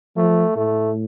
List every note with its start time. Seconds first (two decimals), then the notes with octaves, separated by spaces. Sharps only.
0.16 F3 A3
0.56 A2 A3